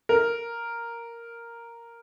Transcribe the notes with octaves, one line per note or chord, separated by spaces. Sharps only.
A#4